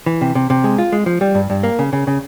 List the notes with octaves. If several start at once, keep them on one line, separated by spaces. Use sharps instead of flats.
E3
C3
C3
C3
G#3
F4
G#3
F3
G3
G2
G2
A#3
C#3
C#3
C#3